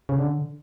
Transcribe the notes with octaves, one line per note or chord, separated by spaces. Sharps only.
C#3
D3